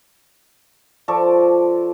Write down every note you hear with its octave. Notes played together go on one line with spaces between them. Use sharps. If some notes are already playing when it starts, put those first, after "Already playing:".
F3 A4 D5 C#6